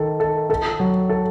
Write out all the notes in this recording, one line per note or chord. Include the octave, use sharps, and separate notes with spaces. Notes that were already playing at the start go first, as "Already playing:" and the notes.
Already playing: D#3 A4
A4
A4
F#3
A4